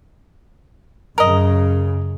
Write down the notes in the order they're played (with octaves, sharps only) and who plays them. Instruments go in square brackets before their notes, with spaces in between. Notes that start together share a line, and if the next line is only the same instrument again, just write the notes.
[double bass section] F#2 C#3 [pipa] A#4 D#5